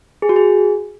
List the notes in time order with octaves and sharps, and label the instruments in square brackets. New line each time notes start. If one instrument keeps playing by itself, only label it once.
[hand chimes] G#4
F#4
G#4